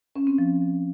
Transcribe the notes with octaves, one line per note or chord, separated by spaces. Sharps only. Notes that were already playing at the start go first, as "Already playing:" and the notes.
C#4
C4
F3